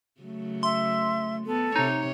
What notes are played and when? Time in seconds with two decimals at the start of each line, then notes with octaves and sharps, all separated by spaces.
0.21 C#3 F#3 A3
0.63 E5 C6
1.46 B3 A4
1.76 C3 D#4 C#5